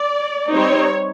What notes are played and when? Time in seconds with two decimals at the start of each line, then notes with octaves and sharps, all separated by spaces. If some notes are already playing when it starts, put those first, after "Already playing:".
Already playing: D5
0.52 G3 C4 D#4 C#5